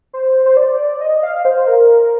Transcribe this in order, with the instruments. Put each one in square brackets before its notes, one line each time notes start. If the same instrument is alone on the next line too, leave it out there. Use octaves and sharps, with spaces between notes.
[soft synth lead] C5
C5
D5
D#5
F5
C5
A#4